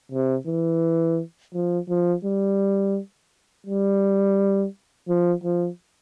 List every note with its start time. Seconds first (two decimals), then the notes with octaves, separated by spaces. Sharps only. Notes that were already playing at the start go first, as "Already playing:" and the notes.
0.11 C3
0.47 E3
1.54 F3
1.89 F3
2.24 G3
3.67 G3
5.08 F3
5.43 F3